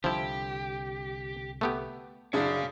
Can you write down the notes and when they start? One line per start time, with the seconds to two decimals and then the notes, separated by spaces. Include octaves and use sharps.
0.04 C2 D3 F3 E4 G4
1.61 A3 B3 G4
2.33 F#2 C#3 D4 C#5 F5